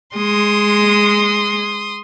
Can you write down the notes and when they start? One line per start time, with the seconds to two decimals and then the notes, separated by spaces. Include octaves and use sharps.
0.16 G#3 C6 D#6